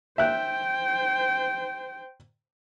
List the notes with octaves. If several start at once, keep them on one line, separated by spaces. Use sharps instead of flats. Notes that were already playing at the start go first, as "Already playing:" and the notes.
C5 E5 G5 F#6